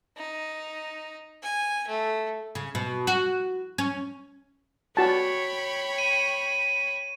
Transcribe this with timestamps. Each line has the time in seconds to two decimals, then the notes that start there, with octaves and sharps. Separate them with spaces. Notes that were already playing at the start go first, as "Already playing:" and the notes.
0.17 D#4
1.42 G#5
1.88 A3
2.55 C#3
2.75 B2
3.07 F#4
3.78 C#4
4.97 F#4 C#5 G5 A5 B5
5.98 D#7